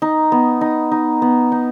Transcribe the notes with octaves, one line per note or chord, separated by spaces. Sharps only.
D#4
B3
D#4
D#4
B3
D#4